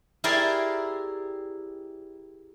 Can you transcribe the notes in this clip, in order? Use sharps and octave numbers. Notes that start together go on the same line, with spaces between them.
E4 G4 G#4 A#4 C5 D5